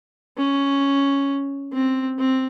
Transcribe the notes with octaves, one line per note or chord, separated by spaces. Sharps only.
C#4
C4
C4